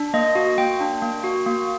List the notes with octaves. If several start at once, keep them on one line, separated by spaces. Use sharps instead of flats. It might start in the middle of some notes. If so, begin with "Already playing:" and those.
Already playing: D4
A#3 D#5
F#4
A#3 G5
D4
A#3
F#4
A#3